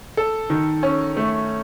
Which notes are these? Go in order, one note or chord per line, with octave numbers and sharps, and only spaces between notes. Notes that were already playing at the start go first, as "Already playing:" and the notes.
A4
D#3
C#4
A3